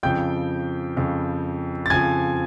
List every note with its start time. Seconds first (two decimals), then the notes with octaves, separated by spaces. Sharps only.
0.03 F2 C#3 F3 G5 G6
0.97 F2 C#3 F3
1.86 A6
1.90 F2 C#3 F3 G#5 G#6